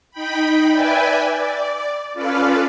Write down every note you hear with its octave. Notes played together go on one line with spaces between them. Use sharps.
D#4 G5 B5
B4 D5 E5 G5 G#5
D5
C#4 F4 A4 B4 D5 F5